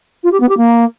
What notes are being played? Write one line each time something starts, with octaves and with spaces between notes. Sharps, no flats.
F4
G4
B3
G4
A#3